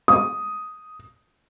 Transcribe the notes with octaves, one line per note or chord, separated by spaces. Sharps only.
D#6